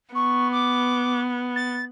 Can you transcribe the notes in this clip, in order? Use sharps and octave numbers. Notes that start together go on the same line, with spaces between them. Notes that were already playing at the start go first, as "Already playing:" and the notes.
B3 C#6
D6
A6